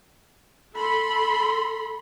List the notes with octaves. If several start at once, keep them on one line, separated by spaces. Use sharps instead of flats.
A4 B5 C6